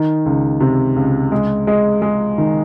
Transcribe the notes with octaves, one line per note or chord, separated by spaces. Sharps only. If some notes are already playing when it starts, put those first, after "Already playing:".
Already playing: D#3
C#2
C3
C#2
G#3
G#3
G#3
D#3